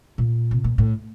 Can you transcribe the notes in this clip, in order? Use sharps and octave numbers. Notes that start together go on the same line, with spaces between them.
A#2
C3
A#2
A2